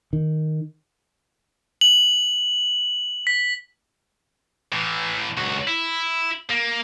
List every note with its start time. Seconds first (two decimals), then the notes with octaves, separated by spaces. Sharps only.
0.13 D#3
1.81 F#7
3.27 B6
4.72 A2 E3
5.37 C#2 F#4
5.67 E4
6.51 A#3